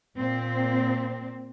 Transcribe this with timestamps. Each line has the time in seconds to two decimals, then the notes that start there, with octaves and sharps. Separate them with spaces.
0.16 A#2 C4